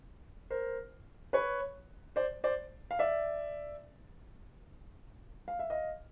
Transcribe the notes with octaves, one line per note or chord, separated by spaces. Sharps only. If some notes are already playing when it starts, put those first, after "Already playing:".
A#4 C5
B4 C#5
C5 D5
C5 D5
F5
D5 E5
F5
E5
D#5 F5